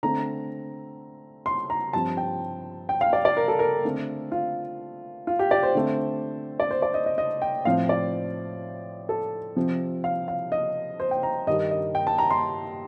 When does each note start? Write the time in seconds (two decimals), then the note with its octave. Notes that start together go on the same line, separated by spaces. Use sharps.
0.03 D3 A3 C4 A#5
1.46 C6
1.70 A#5
1.93 G2 F3 C4 A5
2.17 G5
2.89 G5
3.01 F5
3.13 D5
3.25 D5
3.37 A#4
3.48 A4
3.59 A#4
3.84 D3 A3 C4
4.32 F4
5.27 F4
5.39 G4
5.51 D5
5.63 C5
5.75 D3 A3 C4
6.60 D5
6.71 C5
6.82 D5
6.94 D#5
7.06 D#5
7.18 D#5
7.42 G5
7.65 A2 F3 C4 F5
7.89 D5
9.09 A4
9.56 C3 F3 C4
10.04 F5
10.28 F5
10.52 D#5
11.00 C5
11.11 G5
11.23 A#5
11.47 G2 D#3 G3 D#5
11.71 D#5
11.95 G5
12.07 A5
12.18 A#5
12.30 C6